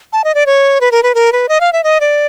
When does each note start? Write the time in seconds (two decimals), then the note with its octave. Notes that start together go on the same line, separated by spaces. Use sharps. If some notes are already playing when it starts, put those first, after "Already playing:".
0.13 A5
0.24 D#5
0.35 D5
0.46 C#5
0.81 B4
0.92 A#4
1.03 B4
1.15 A#4
1.32 B4
1.49 D#5
1.61 F5
1.73 E5
1.84 D#5
2.00 D5